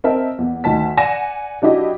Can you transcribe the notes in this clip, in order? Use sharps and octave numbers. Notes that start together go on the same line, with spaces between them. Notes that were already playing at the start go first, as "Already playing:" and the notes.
C4 A#4 D#5 E5 A5
E2
D2 D#3 A5 B6
D5 F#5 G#5 A#6 E7
F#3 D4 E4 G4 D#5